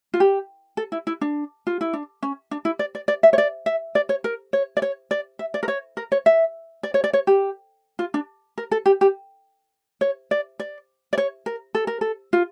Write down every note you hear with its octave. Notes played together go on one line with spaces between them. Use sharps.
F4
G4
A4
E4
E4
D4
F4
E4
D4
C#4
D4
E4
D5
D5
D5
E5
C#5
D5
E5
D5
C#5
A#4
C#5
D5
C#5
D5
E5
D5
A#4
C#5
A#4
C#5
E5
D5
C#5
D5
C#5
G4
F4
D4
A#4
A4
G4
G4
C#5
D5
D5
D5
C#5
A#4
A4
A#4
A4
F4